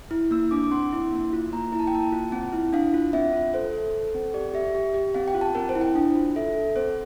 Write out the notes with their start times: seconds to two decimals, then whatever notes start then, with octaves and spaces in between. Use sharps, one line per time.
0.11 E4
0.31 A#3 E6
0.51 D4 D6
0.64 D6
0.71 C4 C6
0.92 E4
1.12 A#3
1.33 F4
1.53 A#3 A#5
1.72 E4 A#5
1.79 A5
1.87 G5
1.93 A#3 A5
2.12 F4
2.32 C4
2.53 E4
2.73 D4 F5
2.94 F4
3.13 C4 E5
3.33 F4
3.54 A4 C5
3.73 A4
3.93 A4
4.14 C4
4.34 G4 D5
4.54 G4 E5
4.75 G4
4.94 G4
5.14 C4 F5
5.28 G5
5.34 F4
5.41 A5
5.55 C4 A#4
5.69 C5
5.75 E4
5.81 G5
5.96 D4
6.15 F4
6.36 A4 E5
6.56 A4
6.76 C4 C5